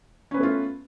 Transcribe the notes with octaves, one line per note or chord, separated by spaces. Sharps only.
A3 B3 C#4 F4 B4